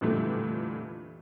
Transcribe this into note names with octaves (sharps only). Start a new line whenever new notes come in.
F2 A#2 D3 E3 G3 A3